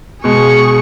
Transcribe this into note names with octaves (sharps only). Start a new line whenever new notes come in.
B2 G#3 G#4 C#6